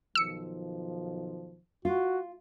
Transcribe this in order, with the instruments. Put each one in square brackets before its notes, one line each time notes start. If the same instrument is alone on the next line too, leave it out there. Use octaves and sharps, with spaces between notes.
[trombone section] B1 D#3 F3 [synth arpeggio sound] E6 C#7
[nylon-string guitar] F4 [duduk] F#4